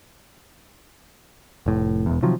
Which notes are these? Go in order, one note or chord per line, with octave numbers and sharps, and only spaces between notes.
F1 A2
E1 E2
C3 D#3 F3 F#3